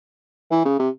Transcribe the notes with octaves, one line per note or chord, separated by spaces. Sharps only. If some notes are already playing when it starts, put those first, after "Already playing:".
E3
C#3
C3